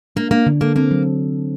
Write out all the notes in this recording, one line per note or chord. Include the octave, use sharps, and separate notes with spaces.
A#3 D4
A#3 D4
D3
A#3 A4
A#3 C4
F#3